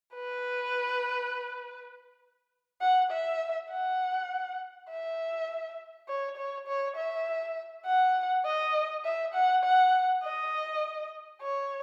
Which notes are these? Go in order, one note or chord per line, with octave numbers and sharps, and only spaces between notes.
B4
F#5
E5
F#5
E5
C#5
C#5
C#5
E5
F#5
D#5
E5
F#5
F#5
D#5
C#5